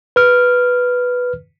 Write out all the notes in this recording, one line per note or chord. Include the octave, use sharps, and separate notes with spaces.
B4 F6